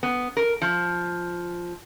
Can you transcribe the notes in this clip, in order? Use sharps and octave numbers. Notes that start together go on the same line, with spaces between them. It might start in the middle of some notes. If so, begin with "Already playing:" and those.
B3
A#4
F3